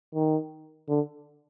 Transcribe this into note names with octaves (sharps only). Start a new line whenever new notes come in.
D#3
D3